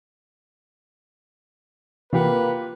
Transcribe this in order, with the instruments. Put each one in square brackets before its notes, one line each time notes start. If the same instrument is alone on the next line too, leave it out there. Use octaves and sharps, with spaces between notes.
[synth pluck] C3 E3 [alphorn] A#3 [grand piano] F4 G4 F#5 [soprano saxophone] B4